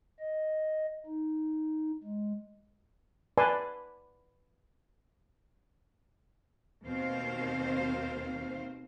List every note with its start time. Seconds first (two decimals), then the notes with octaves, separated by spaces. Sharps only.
0.19 D#5
1.06 D#4
2.03 G#3
3.38 B4 D5 G#5 A5 C6
6.85 D#2 B2 D#3 C4 C5 F5